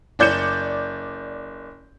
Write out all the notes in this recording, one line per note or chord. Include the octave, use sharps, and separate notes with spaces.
F#1 D5 G6 C#7 E7